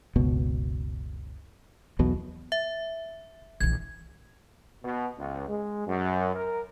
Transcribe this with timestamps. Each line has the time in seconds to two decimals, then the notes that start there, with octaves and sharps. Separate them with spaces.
0.15 F#1 C#2 B2
1.99 B1 E2 B2
2.52 E5
3.60 A#1 E3 G#6
4.83 B2
5.18 C#2
5.47 G#3
5.87 F#2
6.35 A#4